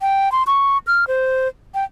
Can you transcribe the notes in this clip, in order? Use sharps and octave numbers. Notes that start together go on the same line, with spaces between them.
G5
C6
C#6
F6
C5
G5